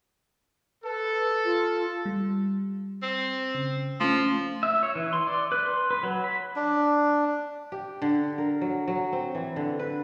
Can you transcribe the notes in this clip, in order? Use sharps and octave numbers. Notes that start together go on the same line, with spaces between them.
A4 B4
F4
G3
C4
C#3
F3 A3 C#4
E5
C#5
E3
C6
D5
B4
C6
B4
F#3
B5
D4
G4
D3
A#4
F#3
F#3
C4
E3
D3
B4